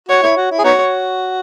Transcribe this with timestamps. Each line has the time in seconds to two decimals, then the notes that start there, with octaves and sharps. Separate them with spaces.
0.08 F#4 C#5
0.22 E4
0.37 F#4
0.51 E4
0.59 G#4
0.64 B3 D#4 F#4 C#5